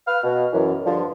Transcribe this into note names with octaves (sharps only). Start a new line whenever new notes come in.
B4 F5 F6
B2
F#2 E3
G2 D3 F3